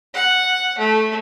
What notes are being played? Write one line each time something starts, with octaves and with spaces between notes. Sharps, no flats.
F#5
A3